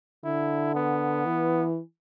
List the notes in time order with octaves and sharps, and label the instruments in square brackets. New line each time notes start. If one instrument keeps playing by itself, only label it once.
[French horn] D3 [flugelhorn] E4
[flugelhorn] B3
[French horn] E3